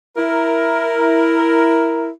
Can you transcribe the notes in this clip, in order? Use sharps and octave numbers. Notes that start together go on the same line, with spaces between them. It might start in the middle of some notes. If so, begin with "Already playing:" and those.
E4 A#4